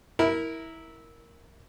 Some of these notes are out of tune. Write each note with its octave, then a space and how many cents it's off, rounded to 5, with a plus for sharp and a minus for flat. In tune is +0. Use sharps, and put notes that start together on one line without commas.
E4 -15 A#4 +0